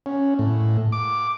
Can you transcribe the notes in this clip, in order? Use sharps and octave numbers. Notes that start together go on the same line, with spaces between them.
C#4
A2
D6